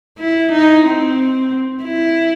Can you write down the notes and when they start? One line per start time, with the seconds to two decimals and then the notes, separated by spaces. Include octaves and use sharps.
0.19 E4
0.52 D#4
0.85 C4
1.84 E4